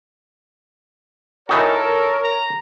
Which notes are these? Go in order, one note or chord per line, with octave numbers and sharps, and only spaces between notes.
E3 D#4 F#4 A4 A#4 C#5
A#5